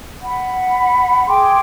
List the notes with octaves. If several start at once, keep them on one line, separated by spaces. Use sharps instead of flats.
F#5 B5
G#4 G5 C6 D6